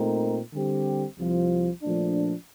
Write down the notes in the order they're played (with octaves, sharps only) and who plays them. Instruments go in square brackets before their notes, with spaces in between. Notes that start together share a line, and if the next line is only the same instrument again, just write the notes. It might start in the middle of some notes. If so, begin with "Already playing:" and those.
Already playing: [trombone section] A#2 A3 C4 D#4 A#4
D3 G3 C4 G4
C2 C3 F3
A#2 F3 A3 D4